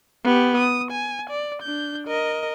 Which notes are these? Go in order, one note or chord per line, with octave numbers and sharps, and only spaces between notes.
B3 G4
D#6
G#5
D5
D4 G6
A#4 D#5